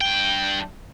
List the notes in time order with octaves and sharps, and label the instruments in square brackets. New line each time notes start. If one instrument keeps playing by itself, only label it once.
[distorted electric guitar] G2 G5